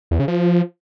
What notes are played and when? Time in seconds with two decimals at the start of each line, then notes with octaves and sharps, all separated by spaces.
0.11 E2
0.19 C#3
0.28 F3